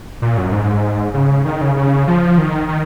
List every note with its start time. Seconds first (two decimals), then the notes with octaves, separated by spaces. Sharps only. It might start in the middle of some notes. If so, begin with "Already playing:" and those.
0.22 A#2
0.38 F#2
0.52 G#2
1.14 C#3
1.45 D#3
1.61 C#3
1.76 C#3
2.07 F3
2.38 D#3
2.68 D#3